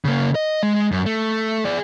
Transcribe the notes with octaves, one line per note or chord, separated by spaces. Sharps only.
C#3 A#3
D#5
G#3
F#2
A3
G#4 D5